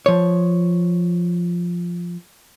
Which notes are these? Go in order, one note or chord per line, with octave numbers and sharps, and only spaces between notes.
F3 C#5